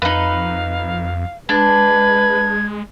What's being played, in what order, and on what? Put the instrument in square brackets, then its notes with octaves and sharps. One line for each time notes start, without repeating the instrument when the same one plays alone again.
[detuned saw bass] F2 [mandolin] D#4 B4 [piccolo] F5
[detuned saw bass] G#3 [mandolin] D4 [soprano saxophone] B4 [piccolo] G#6